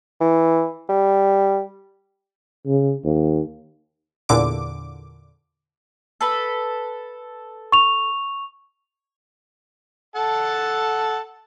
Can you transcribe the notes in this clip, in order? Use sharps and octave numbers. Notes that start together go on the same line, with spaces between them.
E3
G3
C#3
D#2
E2 A#2 D3 D6
A4 B4 B5
C#6 F7
A4 F#5 A5